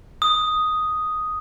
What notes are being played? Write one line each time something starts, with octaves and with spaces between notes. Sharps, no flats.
D#6